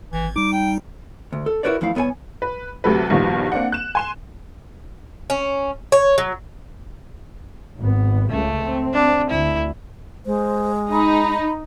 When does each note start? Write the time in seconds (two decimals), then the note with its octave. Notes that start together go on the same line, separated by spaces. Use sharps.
0.13 G#1 E3
0.36 G3 D#4 D6
0.52 G5
1.33 D2
1.46 A4
1.63 E4 F#4 A#4 B4 C#5 D5
1.81 E2 F3 A3 E4 F5
1.95 C2 B3 B4 C#5 G#5
2.42 B4
2.84 D2 C3 F#3 A4 B4
3.10 A#1 G2 B2 D#3 F3
3.52 A#3 C4 D4 F#5
3.72 F#6 E7
3.95 G#5 C6 E7
5.30 C#4
5.92 C#5
6.18 F#3
7.78 G#1 B3
8.30 C#2 C#3 A3
8.60 C4
8.93 D4
9.30 D2 E4
10.26 G#3 C5
10.92 D#4 B5